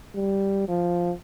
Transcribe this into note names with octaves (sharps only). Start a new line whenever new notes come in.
G3
F3